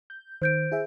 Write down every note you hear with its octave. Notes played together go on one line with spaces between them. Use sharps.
G6
D#3 C5 G6 D7
E4 G#4 E5